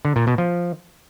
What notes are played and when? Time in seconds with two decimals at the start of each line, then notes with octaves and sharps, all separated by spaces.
0.05 D3
0.16 A#2
0.27 B2
0.38 F3